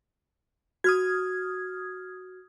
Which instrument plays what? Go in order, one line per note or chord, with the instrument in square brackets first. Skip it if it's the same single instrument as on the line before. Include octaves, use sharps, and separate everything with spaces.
[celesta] F#4 [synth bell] D#6 F6 G#6